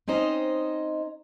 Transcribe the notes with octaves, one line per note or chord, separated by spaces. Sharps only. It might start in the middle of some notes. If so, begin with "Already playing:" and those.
C4 C#4 D#4 C5 D#5